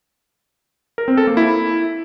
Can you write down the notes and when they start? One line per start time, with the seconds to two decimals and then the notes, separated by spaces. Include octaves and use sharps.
0.98 A#4
1.08 C4
1.17 A4
1.27 A#3
1.37 E4